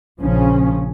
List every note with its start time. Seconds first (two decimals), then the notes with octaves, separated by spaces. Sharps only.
0.21 A#1 C#3 F3 C#4